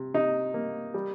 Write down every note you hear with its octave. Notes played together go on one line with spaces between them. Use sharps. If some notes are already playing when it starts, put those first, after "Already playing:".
Already playing: C3
C3 D#4
A#3
G3